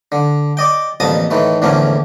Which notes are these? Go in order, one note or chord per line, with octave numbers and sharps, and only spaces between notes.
D3
D5 D#5 G5
A1 F2 A#2 D#5 A5 D#6
A2 D#3 E3 A3
E2 A2 D3 F3 A#3 C#4